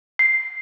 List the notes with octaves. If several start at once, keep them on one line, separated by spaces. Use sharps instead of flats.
C7